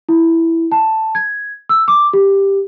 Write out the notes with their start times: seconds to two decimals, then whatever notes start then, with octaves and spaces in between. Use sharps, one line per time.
0.09 E4
0.72 A5
1.15 G#6
1.69 E6
1.88 D6
2.13 G4